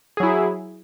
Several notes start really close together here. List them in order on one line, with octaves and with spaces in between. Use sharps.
G#4 F#3 E4